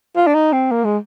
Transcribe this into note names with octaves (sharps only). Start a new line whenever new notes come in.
F4
D4
D#4
C4
A#3
G#3